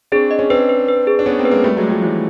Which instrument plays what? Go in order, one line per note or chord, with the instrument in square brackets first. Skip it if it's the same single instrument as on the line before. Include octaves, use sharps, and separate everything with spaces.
[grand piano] C4 D4 [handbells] G#4
[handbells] D#5
[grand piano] C#4
[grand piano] C4 D4 [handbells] B4
[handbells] B4
B4
G#4
[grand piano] D4
[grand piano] B3 C#4 [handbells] G#4
[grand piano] A#3 C4
[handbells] B4
[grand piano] G#3 A#3
[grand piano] G3 A3 [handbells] F#4
[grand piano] F#3 G#3
[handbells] A3
[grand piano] F3 G3
[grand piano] E3 F#3 [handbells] A3